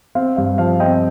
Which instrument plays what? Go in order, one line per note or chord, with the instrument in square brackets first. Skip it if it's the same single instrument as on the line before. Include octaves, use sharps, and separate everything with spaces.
[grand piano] C4 F5
G2 F5
F3 F5
C4 D#5 G5